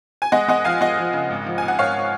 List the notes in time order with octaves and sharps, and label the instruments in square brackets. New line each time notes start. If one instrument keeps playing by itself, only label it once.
[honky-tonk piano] G#5
G#3 D#5 F#5
G#3 D#5 F#5
F3 F5 G#5
G#3 D#5 F#5
F3
C#3
G#1
F3
G#1 G#5
F#5
G#1 C#5 F5